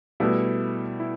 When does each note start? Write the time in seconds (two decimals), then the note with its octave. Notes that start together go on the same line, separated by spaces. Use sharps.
0.20 B2 G3 A3 B3 E4
1.00 E4